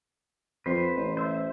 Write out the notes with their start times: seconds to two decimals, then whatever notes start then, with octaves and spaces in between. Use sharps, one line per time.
0.66 F2 B4 C5
0.97 A1
1.17 C5 E5